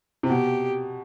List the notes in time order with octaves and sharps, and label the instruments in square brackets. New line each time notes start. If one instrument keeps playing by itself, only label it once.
[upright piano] C3
[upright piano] B2 [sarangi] G4